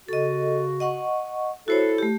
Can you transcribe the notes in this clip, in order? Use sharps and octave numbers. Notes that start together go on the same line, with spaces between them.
C#3 F#4 A4 D#5
D#5 F#5 C#6
E4 F#4 A4 C5 C#5
A3 G4